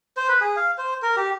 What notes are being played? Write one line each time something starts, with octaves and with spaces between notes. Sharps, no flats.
C5
B4
G#4
F5
C5
A#4
G4